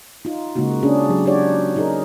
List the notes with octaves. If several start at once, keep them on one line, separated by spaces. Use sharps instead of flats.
D#4 F4
C#3 G#3 A#3 D#4 F#4
C#4 D4 G#4
F#3 G4
D4 D#4 F#4 G4 C#5 D5
D#4 G#4 A#4